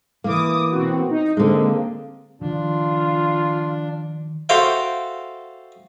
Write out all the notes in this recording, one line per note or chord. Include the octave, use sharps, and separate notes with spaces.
E3 A#3 D6 D#6
B2 C4 F#4
D#4
D3 G#3 A#3 C4
D#3 F3 D4 F4
F#4 A4 C5 E5 F5 G5